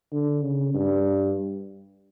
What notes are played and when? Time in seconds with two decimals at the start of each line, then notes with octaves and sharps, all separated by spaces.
0.12 D3
0.43 C#3
0.74 G2